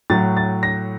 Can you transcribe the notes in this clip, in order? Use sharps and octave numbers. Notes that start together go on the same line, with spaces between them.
A2 F#3 A6
A6
A#6